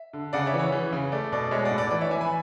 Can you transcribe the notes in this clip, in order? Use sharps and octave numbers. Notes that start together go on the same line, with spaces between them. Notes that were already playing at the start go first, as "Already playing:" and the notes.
Already playing: E5
D3
C#3 D5 F#5
C#5 E5
E3
C#5
E3
C#3
A3 D5
B2 D5
G#3 C#5 E5
D5 F#5
A2
D5
E3 D5
C#5 E5
E3 E5 G#5
G#5 B5